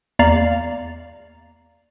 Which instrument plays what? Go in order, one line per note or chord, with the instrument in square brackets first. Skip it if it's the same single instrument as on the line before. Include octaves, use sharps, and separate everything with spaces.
[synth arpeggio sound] E2 A#3 D5 F5 A#5